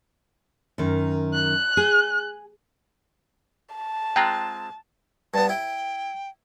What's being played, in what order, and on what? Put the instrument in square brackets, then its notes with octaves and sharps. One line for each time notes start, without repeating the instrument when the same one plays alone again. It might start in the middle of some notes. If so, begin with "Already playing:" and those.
[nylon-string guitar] F#2 D#3
[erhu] F#6
[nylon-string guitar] G#4
[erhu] A5
[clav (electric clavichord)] G#3 C4 F4 [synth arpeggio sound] G5 A#5 F#6
[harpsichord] G2 B3 [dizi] A5
[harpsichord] E4 [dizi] G5